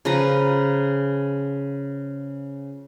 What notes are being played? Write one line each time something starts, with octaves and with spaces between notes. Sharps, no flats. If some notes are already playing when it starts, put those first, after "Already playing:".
C#3 F3 B4 A#5